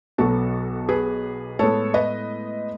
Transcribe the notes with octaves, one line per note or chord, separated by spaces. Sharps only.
B1 B2 F#3 B3 F#4 A4
G#4 B4
A2 G#3 B3 A4 C#5
B4 D#5